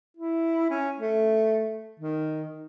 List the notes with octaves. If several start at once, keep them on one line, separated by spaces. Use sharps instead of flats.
E4
C#4
A3
D#3